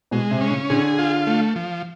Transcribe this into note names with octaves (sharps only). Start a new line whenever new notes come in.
B2 G#3
C3
C#4
C#3
D3 G#4
F4
A3
F3